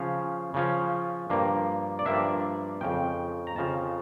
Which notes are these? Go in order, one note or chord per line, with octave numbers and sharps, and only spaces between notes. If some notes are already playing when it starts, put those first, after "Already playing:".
Already playing: C#3 F3 C#4 F5
C#3 F3 C#4
G2 F3 A#3 D4
D5
G2 F3 A#3 D4 E5
F2 C#3 F3 G5
A#5
F2 C#3 F3 A5